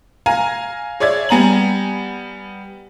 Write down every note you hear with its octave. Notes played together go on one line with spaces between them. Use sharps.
F5 G#5 A#5
G#4 C#5 D5 E5 G#6
G3 B3 G#5 A#5 F#7